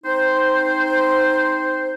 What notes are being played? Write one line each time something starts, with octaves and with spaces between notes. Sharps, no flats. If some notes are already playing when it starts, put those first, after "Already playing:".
C4 D#4 C5